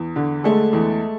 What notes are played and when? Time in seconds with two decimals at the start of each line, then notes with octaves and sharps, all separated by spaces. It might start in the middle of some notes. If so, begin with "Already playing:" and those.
Already playing: E2
0.16 D3
0.44 G#3 A3 A4
0.73 E2